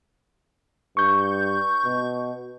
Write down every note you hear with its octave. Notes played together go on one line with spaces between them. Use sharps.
G2 C#6 G6
B2